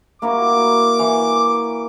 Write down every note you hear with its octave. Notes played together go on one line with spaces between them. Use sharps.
A#3 E4 F#4 D6
E3